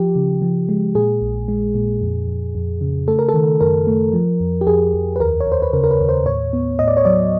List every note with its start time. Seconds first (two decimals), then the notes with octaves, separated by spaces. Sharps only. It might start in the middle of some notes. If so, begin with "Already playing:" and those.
Already playing: F3 G4
0.16 C#3
0.42 F3
0.69 G#3
0.95 A#2 G#4
1.21 A#1
1.48 G#3
1.75 A#2
2.01 F2
2.28 F2
2.55 F2
2.81 C#3
3.08 A3 A4
3.19 A#4
3.29 A4
3.34 D#3
3.61 F#2 A#4
3.87 A3
4.13 F3
4.40 F2
4.61 G4
4.67 F2 G#4
4.94 F2
5.16 B4
5.20 D#2 A#4
5.40 C#5
5.47 D#2 C5
5.62 B4
5.73 C#3 A#4
5.84 A#4
5.91 B4
6.00 D#2
6.09 C5
6.26 A2 C#5
6.53 B3
6.79 A2 D#5
6.88 D5
6.97 C#5
7.05 F#3 D5